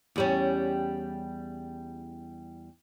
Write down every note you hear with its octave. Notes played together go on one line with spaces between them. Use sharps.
E2 G3 C#4